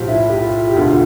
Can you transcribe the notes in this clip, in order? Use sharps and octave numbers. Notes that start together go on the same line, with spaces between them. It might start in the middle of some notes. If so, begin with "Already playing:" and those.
Already playing: B1 A2 F3 F4 G4
E4
G4
F4
G4
E1 D2 D3 F4